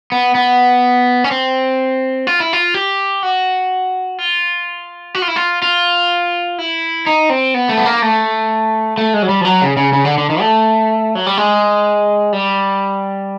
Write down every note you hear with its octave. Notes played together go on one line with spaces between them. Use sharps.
B3
B3
C#4
C4
F4
E4
F4
G4
F#4
F4
F#4
F4
E4
F4
F4
E4
D#4
C4
B3
A3
B3
A#3
A3
A3
G#3
F#3
G3
F3
F#3
C#3
C#3
C#3
D3
D3
D#3
A3
F#3
G3
G#3
G3